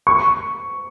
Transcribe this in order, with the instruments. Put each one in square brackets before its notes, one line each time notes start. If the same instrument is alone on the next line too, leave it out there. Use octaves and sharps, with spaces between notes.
[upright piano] C#6